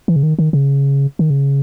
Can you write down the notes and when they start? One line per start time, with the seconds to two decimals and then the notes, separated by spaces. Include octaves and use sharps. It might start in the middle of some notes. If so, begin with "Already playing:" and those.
0.08 E3
0.16 C#3
0.23 D#3
0.39 D#3
0.53 C#3
1.19 D#3
1.30 C#3